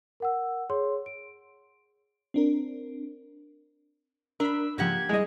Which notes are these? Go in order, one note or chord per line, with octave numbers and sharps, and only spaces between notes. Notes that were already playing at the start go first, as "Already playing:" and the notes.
A#4 F#5 E6
G#4 C#5 C6
D7
C4 D4 A#4
D4 A#4 B5 E6
G#2 C#3 F3 A#3 G4 F#5 G#6
G3 G#3 E4 G#4 D#5